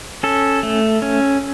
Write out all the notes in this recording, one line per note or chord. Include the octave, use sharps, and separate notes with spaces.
C#4 A4
A3
C#4